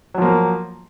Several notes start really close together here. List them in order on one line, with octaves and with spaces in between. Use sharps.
F#3 F3 A#3